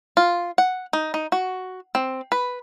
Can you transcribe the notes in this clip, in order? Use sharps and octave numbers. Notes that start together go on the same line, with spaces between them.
F4
F#5
D#4
D#4
F#4
C4
B4